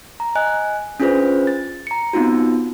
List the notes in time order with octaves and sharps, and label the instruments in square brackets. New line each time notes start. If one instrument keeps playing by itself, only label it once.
[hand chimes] A#5
D#5 G#5 F#6
C#4 D4 F4 G#4 B4 C5
A6
A#5 C#7
B3 C4 D#4 F4 F#4